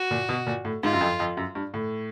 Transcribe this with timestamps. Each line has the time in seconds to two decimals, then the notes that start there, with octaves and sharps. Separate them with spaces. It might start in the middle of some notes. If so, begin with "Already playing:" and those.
Already playing: F#4
0.11 A#2
0.29 B2
0.47 A#2
0.65 A2
0.83 G#2 F4
0.93 F#2
1.01 F2
1.20 F2
1.37 F#2
1.55 G2
1.74 A2